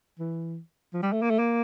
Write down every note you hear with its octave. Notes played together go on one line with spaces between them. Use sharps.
E3
F3
G3
A3
A#3
A3
A#3